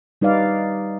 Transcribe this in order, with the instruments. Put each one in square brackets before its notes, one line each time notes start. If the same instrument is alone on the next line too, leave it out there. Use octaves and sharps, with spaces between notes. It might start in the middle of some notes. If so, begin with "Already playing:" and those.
[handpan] G3 D#4 B4 D5 F5